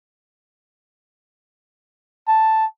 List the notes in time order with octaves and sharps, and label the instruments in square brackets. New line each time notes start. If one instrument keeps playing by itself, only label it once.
[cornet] A5